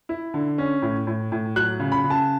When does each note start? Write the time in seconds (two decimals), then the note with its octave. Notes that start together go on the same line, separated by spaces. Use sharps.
0.09 E4
0.34 D3
0.58 C#4
0.82 A2
1.07 A2
1.32 A2
1.56 F#3 F#6
1.80 C#3
1.92 B5
2.04 C#3
2.10 A5